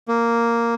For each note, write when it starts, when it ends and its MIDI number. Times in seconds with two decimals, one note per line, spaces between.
0.08 0.75 58